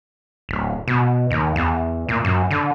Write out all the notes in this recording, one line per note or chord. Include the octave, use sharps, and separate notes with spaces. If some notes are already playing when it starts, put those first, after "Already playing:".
D1
B2
D#2
E2
A#2
F#2
D3